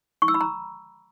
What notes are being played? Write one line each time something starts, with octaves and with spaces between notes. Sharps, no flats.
C#6
E6
B5
A#5